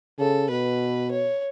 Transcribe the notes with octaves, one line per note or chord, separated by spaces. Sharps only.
C#3 A4
B2 B4
C#5